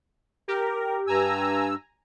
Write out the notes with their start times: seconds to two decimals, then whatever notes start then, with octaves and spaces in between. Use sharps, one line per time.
0.48 G4 A#4
1.07 G2 G#5 A#5 E6